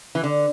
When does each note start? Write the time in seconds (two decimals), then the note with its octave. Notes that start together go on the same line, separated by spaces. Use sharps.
0.15 E3
0.24 D3